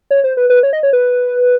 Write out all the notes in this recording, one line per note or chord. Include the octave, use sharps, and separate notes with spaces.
C#5
C5
B4
B4
C#5
D#5
C#5
B4